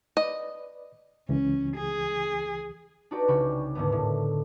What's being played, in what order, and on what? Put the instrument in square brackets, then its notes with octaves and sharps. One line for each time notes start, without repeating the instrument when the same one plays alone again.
[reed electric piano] B4 D5 [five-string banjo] D#5
[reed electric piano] C#2 E3 [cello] C#4
[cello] G#4
[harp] D4 D#4 F#4 G4 B4 D5
C2 C#3 G5 B5 C#6
D#2 G#2 D3 A3 B3
A2